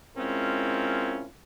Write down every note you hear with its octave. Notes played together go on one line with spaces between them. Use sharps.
G#3 C4 C#4 E4 F4 A#4